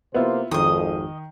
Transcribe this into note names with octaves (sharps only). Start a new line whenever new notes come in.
C3 A#3 B3 E4 F4 C5
G#1 F2 D#3 D#5 D#6